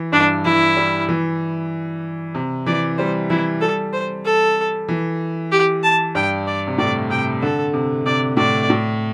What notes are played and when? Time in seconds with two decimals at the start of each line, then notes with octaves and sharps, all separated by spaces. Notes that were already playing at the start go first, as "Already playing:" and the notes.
Already playing: E3
0.12 G2 D4
0.45 E3 E4
0.77 G3
1.09 E3
2.35 C3
2.66 E3 D5
2.98 G3 C5
3.30 E3 E4
3.61 G3 A4
3.93 C5
4.26 A4
4.88 E3
5.52 G4
5.83 A5
6.15 G2 G5
6.47 D5
6.67 C3
6.78 A2 D5
7.10 C3 G5
7.42 D3 A4
7.74 C3
8.06 C3 D5
8.37 A2 D5
8.70 A2